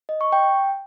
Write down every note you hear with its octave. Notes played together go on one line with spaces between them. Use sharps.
D#5
C#6
G5